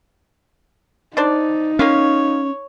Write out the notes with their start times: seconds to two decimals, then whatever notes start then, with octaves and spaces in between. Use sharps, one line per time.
1.17 D4 D#4 C5 D5
1.79 A#3 C#4 F4 C#5 F5